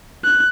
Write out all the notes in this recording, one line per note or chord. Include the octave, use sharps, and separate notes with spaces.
F#6